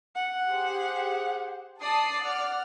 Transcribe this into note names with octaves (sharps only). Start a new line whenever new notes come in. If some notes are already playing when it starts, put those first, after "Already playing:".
F#5
G4 G#4 C5
D5 A5 D#6 C7
F#5 F6